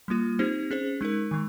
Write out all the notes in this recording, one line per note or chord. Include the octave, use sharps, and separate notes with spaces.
G3 A#3 F4
C4 D#4 G4 C5
C#4 G#4 C5
G#3 D#4 A#4
D#3 G#3